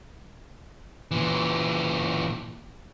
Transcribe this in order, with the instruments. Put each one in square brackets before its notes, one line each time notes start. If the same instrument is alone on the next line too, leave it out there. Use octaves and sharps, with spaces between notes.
[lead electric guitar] A#2 E3